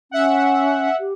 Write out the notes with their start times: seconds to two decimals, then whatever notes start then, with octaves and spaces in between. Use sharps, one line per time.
0.11 C#4 E5 F#5
1.00 G4